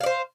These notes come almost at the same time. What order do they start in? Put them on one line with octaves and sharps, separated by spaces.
F5 D5 C5